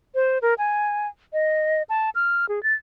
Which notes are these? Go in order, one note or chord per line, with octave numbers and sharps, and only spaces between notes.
C5
A#4
G#5
D#5
A5
F6
G#4
A6